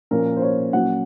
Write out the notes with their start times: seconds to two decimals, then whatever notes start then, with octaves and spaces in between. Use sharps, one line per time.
0.11 A#2 F3 A#3 C#4 A#4
0.36 C5
0.42 C#5
0.73 A#2 F#3 A#3 C#4 F#5